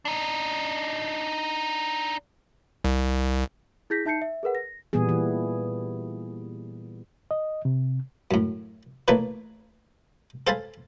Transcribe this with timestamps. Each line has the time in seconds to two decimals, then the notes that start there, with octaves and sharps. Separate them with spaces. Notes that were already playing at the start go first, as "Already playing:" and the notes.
0.05 D4 D#4
2.85 C2
3.90 E4 G#4 G6 A#6 B6
4.05 D#4 E5 A5 G6 C7 C#7
4.22 E5
4.43 G#4 A#4 B4 F#5
4.55 A#6
4.93 A#2 E3 G3 B3 G#4
5.09 E3
7.31 D#5
7.65 C3
8.31 F#2 A2
9.08 E3 A3 A#3 D#4 B4 C#5
10.47 A4 C5 F5 G#5 A5 B5